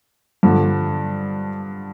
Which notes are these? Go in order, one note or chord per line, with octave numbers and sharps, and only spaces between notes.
G2 D3 F3